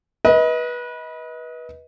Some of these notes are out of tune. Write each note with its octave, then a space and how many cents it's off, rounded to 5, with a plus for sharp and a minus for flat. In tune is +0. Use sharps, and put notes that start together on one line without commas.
B4 -20 D#5 +30